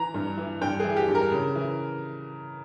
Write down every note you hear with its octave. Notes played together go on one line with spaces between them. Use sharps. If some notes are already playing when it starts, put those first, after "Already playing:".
Already playing: E3 A#5
G2
E3
G2 G5
E3 G#4
G4
G2
A#4
C#3
E3